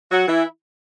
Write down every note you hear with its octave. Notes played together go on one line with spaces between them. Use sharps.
F#3 F#4
E3 E4